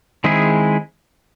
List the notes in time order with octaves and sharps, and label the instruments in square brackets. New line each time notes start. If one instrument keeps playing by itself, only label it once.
[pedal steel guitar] D#3 G#3 C4 E4 G#4